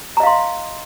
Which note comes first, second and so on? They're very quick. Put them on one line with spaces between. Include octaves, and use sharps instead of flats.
A#5 D#5 F5 C6